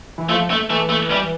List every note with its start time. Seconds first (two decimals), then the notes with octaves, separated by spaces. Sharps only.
0.18 E3
0.29 F3 A3
0.50 A3
0.70 E3 A3
0.89 A3
1.11 G3